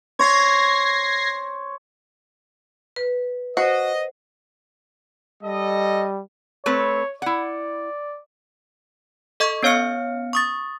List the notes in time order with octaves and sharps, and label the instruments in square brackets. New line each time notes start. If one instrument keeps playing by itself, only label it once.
[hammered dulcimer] C5 C#5 C6 [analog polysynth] G#6 A#6 C7
[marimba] B4
[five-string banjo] F#4 [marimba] C5 [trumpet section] D#5
[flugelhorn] G3 [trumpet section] A4 D#5
[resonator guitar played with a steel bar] A3 C4 B4 [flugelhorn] C#5
[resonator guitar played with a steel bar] E4 F#5 [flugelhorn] D5
[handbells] A4 D#5 C#6 G#6
B3 C#4 C#5 F5 F6 C#7
C#6 D#6 A6